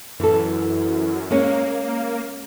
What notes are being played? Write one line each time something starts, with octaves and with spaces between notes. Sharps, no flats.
F#2 E3 A4
G#3 A#3 C#4